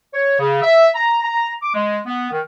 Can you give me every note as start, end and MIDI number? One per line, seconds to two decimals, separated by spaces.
0.14 0.36 73
0.39 0.60 49
0.62 0.88 76
0.94 1.19 82
1.23 1.51 82
1.62 1.71 86
1.74 1.99 56
2.06 2.30 59
2.31 2.40 51